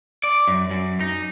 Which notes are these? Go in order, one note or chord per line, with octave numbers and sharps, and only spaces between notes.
D5
F#2
F#2
D#4